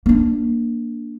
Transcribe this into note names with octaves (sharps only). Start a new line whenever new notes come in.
A#3 D4